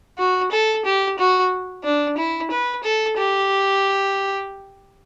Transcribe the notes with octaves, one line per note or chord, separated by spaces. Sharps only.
F#4
A4
G4
F#4
D4
E4
B4
A4
G4